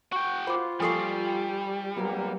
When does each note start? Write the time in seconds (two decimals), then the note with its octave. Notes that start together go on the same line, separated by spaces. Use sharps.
0.12 F#4 G5 C#6
0.47 F4 C5 B5 D6
0.80 F3 G3 A4 G#5 C#6 D#6 C7
1.97 G#1 F#3 A#3 B3